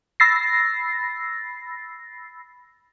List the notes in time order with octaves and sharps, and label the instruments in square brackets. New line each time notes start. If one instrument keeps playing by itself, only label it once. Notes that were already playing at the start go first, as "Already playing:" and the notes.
[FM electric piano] B5 E6 A6 A#6 C7